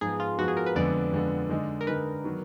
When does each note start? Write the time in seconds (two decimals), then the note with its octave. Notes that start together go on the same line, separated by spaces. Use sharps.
0.01 G#2 F3 B3 G#4
0.20 F4
0.38 G#2 F3 B3 F#4
0.48 G#4
0.57 A#4
0.66 B4
0.75 F2 D3 G#3 B3 D5
1.12 F2 D3 G#3 B3
1.49 D3 G#3 D#4
1.81 A#4
1.87 D3 G#3 D#4 B4
2.24 D#3 F#3 B3